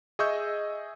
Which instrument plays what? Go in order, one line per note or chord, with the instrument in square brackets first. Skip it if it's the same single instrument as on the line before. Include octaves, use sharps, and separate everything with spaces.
[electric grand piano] G#4 D#5 E5 C#6 E6 G6